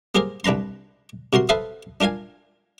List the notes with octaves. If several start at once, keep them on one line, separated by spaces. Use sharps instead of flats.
A#3 G4 G#4 A#4 C5
C2 D4 B4 A#5 C6
C3 F#4 A#4 C6
A4 B4 C5 E5 F5 D#6
D4 F4 A#4 F5 G#5